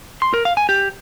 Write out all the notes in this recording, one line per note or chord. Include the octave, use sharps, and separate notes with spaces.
C6
A#4
F5
G#5
G4